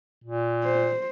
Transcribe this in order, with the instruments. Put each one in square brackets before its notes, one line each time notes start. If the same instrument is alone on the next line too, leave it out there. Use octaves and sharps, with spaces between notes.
[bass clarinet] A#2
[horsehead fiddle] C5